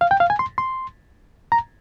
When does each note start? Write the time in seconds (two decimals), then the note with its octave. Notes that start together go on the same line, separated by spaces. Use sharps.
0.01 F5
0.11 G5
0.20 F5
0.30 G#5
0.39 C6
0.58 C6
1.52 A#5